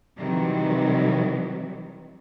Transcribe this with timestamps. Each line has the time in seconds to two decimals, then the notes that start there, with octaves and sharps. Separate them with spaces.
0.17 C3 D#3 E3 F#3 G3